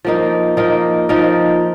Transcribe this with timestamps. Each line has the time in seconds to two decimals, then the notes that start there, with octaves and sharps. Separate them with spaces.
0.04 F3 A#3 D#4 A#4
0.57 F3 A#3 D#4 A#4
1.09 F3 A#3 D#4 A#4